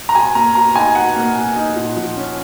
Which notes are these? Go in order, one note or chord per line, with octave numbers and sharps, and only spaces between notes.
A#5
B2 G#5
A#3 A#5
B2 A#5
D#4 G#5
B2 F#5
A#3
B2
D#4
A#2
F3
C#4